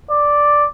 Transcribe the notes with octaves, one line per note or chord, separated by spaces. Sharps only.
D5